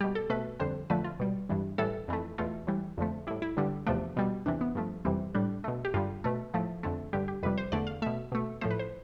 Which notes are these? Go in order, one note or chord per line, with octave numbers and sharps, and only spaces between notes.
B2 G3 G4
A4
B2 A3 B4
F2 D3 G3 C5
F2 D3 F3 A3 B4
F4
B2 G3
G2 E3 G3
A2 E3 G3 A4
F2 E3 A3
E2 B2 A3 F4
A2 E3 G3
F2 D3 F3 A3
A2 G3 E4
E4
G2 D3 G3
E2 C3 F3 A3 D4
B2 G3
E2 C3 E3 D4
B3
G2 F3 A3
F2 C3 E3 G3 C4
A2 G3 D4
B2 A3
G4
G2 D3 G3 F4
B2 A3
A2 F3 A3
F2 D3 A3
G2 D3 G3 G4
G4
F2 C3 G3 B4
C5
E2 D3 A3 D5
F5
B2 A3 E5
B2 A3
A2 F3 A3 C5
B4
C5